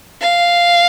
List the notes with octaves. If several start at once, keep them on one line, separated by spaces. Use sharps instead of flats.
F5